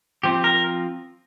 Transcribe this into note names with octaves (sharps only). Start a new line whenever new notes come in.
F3 C4 G4
A#4